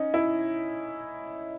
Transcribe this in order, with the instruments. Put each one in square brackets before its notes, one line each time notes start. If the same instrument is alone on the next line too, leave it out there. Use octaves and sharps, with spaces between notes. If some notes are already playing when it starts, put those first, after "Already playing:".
Already playing: [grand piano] C#4 D#4
E4